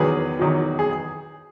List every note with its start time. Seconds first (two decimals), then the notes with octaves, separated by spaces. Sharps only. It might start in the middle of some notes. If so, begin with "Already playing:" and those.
Already playing: E2 D#3 F#3 G#4 B4
0.39 E2 D#3 F#3
0.79 G#4